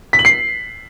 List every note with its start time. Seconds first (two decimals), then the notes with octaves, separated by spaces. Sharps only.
0.13 B6
0.19 F#7
0.25 C7